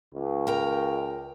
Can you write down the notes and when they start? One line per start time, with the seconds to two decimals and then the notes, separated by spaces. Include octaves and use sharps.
0.14 C#2
0.47 A#4 G5 A#5